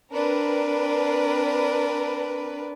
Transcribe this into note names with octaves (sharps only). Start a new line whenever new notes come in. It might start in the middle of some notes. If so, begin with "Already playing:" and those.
C4 D4 A#4 B4